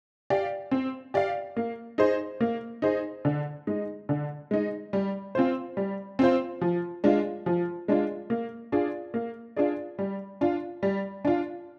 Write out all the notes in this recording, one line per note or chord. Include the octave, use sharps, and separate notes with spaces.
G4 D5 F5
C4
G4 D5 F5
A#3
D#4 G#4 C5
A#3
D#4 G#4 C5
D3
G#3 D#4
D3
G#3 D#4
G3
C4 F4 C5
G3
C4 F4 C5
F3
G#3 D4 F4
F3
G#3 D4 F4
A#3
D4 F4 G#4 D5
A#3
D4 F4 G#4 D5
G3
D4 F4
G3
D4 F4